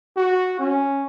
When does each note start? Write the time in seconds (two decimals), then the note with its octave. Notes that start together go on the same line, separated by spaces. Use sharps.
0.16 F#4
0.59 C#4